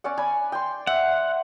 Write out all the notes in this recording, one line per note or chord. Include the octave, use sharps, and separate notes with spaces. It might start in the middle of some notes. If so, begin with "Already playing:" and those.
C#4 D5 F#5
D5 G#5 B5
G5 C6
E5 F#5